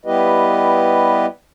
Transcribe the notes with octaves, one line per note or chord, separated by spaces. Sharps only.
G3 B3 E4 G4 B4 D#5